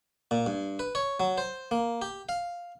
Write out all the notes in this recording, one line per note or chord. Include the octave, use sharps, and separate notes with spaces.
A#2
G2
B4
C#5
F#3
C5
A#3
G4
F5